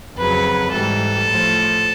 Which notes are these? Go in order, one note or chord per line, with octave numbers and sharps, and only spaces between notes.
F2 C#3 F#3 B4
G#2 E3 G3 A4
A2 F3